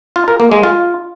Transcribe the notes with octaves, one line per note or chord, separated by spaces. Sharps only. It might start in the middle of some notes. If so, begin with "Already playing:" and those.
F4
A#4
A#3
G#3
F4